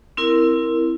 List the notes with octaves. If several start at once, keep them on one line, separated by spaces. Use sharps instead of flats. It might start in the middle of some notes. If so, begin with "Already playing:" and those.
C4 E4 A#4